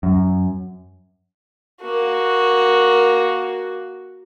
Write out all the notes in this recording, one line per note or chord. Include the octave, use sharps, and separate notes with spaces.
F#2
A#3 F#4